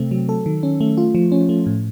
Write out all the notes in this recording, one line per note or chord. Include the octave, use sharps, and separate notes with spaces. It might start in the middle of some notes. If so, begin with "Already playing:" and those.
Already playing: C3 A3 C4
F#3
A4
D#3
C#4
A3
F4
F3
C#4
A3
A2